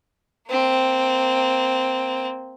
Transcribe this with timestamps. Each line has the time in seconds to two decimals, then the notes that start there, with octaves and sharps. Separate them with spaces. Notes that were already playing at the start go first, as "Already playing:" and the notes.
0.49 A#3 C4